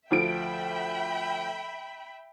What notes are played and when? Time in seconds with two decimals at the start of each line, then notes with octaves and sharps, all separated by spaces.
0.11 D2 F3 E5 G5 B5 D7